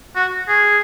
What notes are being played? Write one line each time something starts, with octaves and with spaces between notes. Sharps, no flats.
F#4
G#4